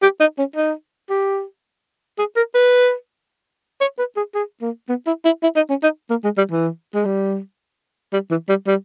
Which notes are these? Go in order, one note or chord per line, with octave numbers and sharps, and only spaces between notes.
G4
D#4
C#4
D#4
G4
G#4
A#4
B4
C#5
B4
G#4
G#4
A#3
B3
E4
E4
E4
D#4
C#4
D#4
A#3
G#3
G3
E3
G#3
G3
G3
E3
G3
G3